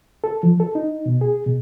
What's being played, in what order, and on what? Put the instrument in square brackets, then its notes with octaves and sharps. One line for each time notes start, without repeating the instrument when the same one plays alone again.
[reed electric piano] A4
F3
A4
D#4
B2
G#4
B2